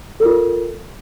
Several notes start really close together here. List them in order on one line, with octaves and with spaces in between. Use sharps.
A4 A#4 F4